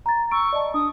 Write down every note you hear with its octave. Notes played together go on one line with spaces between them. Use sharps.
A#5 A6
C#6 E6 D7
D5 D#5 A5
D4 D#6